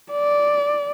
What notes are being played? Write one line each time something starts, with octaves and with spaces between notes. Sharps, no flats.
D5